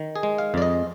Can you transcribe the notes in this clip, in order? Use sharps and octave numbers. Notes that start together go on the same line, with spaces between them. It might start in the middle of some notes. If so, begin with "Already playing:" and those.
Already playing: D#3
G#4
G#3
F5
F2 D5
D#5